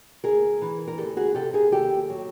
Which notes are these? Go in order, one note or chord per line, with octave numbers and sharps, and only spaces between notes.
D2 G#4 A#4
E3
A#4
D2 G4 A4
F#4 G#4
C3 G4 A4
G#4 A#4
D#2 G4 A4
F#3